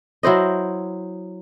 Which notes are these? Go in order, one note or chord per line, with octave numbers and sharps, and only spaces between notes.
F#3 E4 C5 D#5